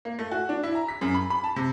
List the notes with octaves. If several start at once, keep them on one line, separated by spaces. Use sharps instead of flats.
A#3
A3
F#4
D4
E4
A#5
B6
F#2
B5
B5
A5
C3